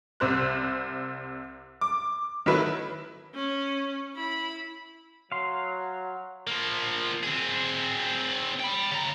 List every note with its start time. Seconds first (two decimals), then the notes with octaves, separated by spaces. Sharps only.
0.20 C2 C3 C5 F#6
1.81 D6
2.46 D#3 F#3 A3 E4 B4
3.35 C#4
4.14 E4 B5
5.32 F#3 F5 C6
6.47 F3 A#3
7.23 C4 G#4
8.59 G5 B5
8.92 C#3 A#5